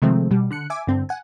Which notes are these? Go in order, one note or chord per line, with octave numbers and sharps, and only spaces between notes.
C3 D#3 F3 G#3 A3 C4
B2 G3
D3 F#6 C#7
E5 G#5 D6
G2 D3 C4
F#5 G#5